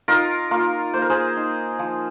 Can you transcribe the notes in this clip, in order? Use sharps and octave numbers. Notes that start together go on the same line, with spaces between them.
D#4 F4 A#4
A#3 F4 A#4
A#3 C5
A#4
G#4 C5
D#4
F3